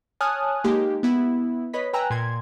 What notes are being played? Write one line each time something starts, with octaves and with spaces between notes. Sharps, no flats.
C#5 G#5 A5 D#6 F6 F#6
G#3 A#3 D#4 G4
B3 E4
B4 C#5 D#5 B5 B6
B4 G5 G#5 A#5 E6 F#6
A#2 C6 G#6